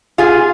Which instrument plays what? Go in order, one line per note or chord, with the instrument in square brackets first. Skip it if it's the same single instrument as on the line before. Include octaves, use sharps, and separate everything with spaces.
[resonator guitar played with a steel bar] F4 G#4